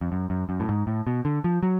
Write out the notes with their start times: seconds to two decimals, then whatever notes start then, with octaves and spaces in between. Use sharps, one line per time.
0.01 F2
0.12 F#2
0.30 F#2
0.49 F#2
0.60 A2
0.69 G#2
0.87 A2
1.07 B2
1.25 D3
1.44 F3
1.63 F#3